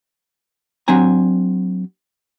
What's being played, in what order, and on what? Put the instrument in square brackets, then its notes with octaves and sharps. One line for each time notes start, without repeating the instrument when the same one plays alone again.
[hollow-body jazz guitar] F#3 C4 D4 G#5 A#5